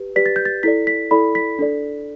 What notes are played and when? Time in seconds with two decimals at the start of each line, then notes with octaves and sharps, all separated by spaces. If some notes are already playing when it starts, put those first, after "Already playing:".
Already playing: G4 B4
0.16 G4 B4 D5 B6
0.26 A6
0.36 G6
0.45 A6
0.63 E4 A4 D5 B6
0.87 B6
1.11 E4 A4 D5 B5
1.35 B6
1.59 D4 A4 D5